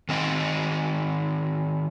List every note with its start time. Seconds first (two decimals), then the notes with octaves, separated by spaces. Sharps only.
0.09 D#3 C4 D#5 G5